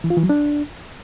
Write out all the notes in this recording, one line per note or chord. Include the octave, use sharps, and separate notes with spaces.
E3
F4
E3
F#3
D4